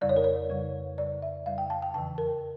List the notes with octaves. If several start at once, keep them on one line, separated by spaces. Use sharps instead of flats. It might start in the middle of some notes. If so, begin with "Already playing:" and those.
F2 C#3 G3 D5
C#5
A#4
C#5
F2 C#3 G3
F2 C#3 G3 D5
E5
F2 C#3 G3 F5
G5
A5
G5
E2 C#3 E3 A5
A#4